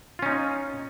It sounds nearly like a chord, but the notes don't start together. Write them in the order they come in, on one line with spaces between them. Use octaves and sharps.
F4 C#4 D#4